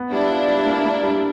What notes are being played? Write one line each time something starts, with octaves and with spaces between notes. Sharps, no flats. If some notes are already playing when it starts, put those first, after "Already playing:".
Already playing: B3
G3 D4 E4
F4
G3
A#3
A#3
G3